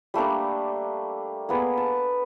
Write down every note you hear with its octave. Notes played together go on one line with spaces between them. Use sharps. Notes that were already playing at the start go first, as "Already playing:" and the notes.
G3 A3 A#3 D4
A#3 B3 G#4
A5